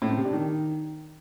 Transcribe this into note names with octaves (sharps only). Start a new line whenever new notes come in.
A2
C4
C3
D4
D#3